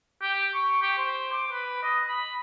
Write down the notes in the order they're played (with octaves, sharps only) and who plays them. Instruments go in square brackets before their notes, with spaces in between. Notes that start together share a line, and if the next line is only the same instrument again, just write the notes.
[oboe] G4
C#6
G4
C5
D6
B4
D#5
B5